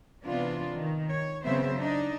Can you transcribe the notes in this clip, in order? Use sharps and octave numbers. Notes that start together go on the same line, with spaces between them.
C3 E3 B3 D4 F4
D#3
C#5
C#3 F#3 B3 C4 C5 E5
D4 D#4 D#5